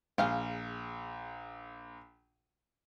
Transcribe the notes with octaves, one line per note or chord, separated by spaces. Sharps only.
A#1 G#4 F5 G5